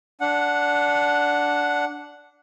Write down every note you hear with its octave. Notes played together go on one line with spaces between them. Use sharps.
D4 F#5